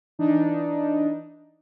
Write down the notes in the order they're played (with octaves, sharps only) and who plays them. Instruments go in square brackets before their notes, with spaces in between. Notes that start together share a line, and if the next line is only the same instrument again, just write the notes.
[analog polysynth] E3 D4 D#4